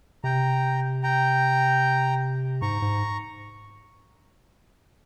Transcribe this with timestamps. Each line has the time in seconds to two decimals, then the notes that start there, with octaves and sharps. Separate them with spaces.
0.24 C3 G5 A#5
1.03 G5 A#5
2.62 G#2 A#5 C#6
2.82 G#2